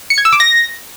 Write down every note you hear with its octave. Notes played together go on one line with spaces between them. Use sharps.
C#7
G#6
E6
D6
A#6